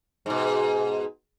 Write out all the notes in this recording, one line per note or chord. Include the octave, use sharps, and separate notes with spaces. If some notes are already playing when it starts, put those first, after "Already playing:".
G#2 B2